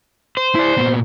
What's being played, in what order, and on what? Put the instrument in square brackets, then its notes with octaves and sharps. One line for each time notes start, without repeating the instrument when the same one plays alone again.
[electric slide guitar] C5
[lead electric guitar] E4 D5
A#2 B3